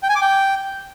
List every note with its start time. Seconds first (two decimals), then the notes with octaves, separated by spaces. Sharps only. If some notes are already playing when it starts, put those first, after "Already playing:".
0.03 G5
0.09 G#5
0.15 D6
0.21 G5